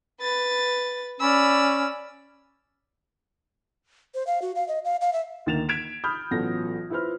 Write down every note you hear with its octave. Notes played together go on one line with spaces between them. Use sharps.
B4 A6
C#4 D5 B5 E6
C5
F5
F#4
F5
D#5
F5
F5
E5
D2 D#3 A#3 A6 E7 F7
G#6 B6 D7 E7 F7
B5 D#6 F6 G6
A1 F#3 B3 F4 A4 A#6
E4 F4 B4 C5 F6